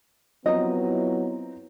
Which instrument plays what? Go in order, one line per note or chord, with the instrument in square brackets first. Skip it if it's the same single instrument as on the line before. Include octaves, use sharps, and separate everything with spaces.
[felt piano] F3 C4 A#5 [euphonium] F#3 [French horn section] B3 E4 [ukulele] D#5